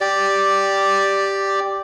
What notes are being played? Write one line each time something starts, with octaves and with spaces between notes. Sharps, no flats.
G4 D5